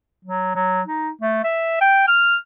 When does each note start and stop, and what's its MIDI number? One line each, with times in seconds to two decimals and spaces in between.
0.25 0.51 54
0.55 0.82 54
0.87 1.10 63
1.21 1.43 57
1.44 1.81 76
1.81 2.04 79
2.08 2.36 89